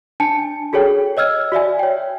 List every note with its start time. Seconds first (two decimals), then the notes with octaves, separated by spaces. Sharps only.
0.20 D4 G#5 A5 C#7
0.73 F#4 G#4 A4 C#5 G5
1.17 C#5 D#5 E6 F6 G#6
1.52 F#4 D5 E5 G#5
1.79 C#5 G5